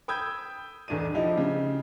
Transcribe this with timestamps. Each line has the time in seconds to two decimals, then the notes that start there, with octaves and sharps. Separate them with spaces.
0.08 G5 B5 D#6 E6 G6 G#6
0.88 B1 E2 D4 D5 D#7
1.14 F3 D#4 E4 G4
1.37 C#3